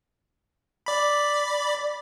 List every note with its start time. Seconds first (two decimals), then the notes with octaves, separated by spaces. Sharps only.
0.86 D5 B5